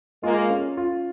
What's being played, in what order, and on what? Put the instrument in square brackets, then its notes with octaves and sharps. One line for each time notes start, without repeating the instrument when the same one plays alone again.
[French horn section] G#3 A#3 [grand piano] F4
[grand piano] C#4
F4